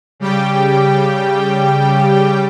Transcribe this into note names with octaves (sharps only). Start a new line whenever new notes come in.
C#3 G3 G4 G5